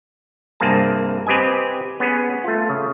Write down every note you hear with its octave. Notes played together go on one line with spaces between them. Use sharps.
C2 G2 A#3 C4 G#4 A5
C4 G4 B4 D#5 G#5
B3 C#4 G#4
A3 F4
C#3